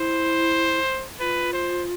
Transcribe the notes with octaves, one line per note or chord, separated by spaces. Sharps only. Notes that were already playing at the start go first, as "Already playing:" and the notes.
Already playing: E4 C5
F4 B4
C5